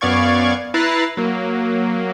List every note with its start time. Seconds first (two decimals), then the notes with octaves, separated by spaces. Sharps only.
0.01 F#2 B3 D5 F5 C#6 G#6
0.74 E4 B4 A#5 F#6 A6 C7
1.17 F#3 A#3